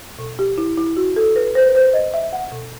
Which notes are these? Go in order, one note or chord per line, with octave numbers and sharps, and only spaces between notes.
B2
G4
E4
E4
F#4
A4
B4
C5
B4
C5
D#5
E5
F#5
B2